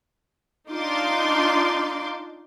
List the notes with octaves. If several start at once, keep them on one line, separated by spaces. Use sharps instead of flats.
D4 D#4 F4 C6 D6